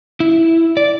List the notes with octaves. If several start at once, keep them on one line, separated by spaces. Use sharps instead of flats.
E4
D5